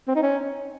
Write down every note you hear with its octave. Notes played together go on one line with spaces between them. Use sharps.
C4
D#4
C#4